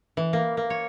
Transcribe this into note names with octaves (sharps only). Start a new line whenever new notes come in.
E3
A#3
A#3
C#5